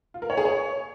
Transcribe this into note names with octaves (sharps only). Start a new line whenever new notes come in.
F4
A#4
C#5
G#4
C#5